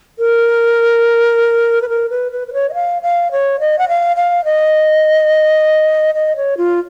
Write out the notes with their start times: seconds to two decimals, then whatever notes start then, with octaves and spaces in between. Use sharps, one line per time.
0.19 A#4
1.82 B4
1.89 A#4
2.10 B4
2.32 B4
2.48 B4
2.53 C#5
2.69 D#5
2.74 F5
3.02 F5
3.31 C#5
3.60 D#5
3.79 F#5
3.88 F5
4.16 F5
4.45 D#5
6.15 D#5
6.36 C#5
6.57 F4